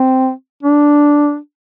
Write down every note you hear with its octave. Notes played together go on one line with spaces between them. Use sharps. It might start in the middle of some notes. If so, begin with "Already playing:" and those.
Already playing: C4
D4